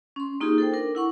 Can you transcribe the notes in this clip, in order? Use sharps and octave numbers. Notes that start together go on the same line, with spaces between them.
C#4 C6
A#3 D#4 F4 G4 G#4
A4 C5 G5
D4 A#4
E4 F#5 C#6